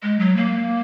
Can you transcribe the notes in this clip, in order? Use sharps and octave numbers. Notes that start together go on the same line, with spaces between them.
G#3
F#3
A#3